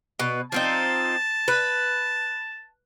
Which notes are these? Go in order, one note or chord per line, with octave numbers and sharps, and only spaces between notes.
B2 B4
F3 C4 D#4 A5
B4